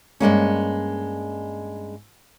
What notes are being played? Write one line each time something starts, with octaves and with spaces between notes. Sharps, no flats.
G2 G#3 A#3 C#4